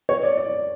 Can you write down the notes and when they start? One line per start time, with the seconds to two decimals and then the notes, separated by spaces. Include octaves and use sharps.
0.09 C#5
0.23 D5
0.37 D5